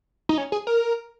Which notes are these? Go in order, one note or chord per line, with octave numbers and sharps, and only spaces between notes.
D#4
C#4
G#4
A#4